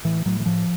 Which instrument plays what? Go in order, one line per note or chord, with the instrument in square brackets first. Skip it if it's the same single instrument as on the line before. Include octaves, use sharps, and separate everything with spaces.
[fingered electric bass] A2 E3
A2 F#3
E3
A2 F3